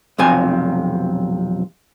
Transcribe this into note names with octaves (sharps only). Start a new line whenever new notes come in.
B1 F2 C3 G#5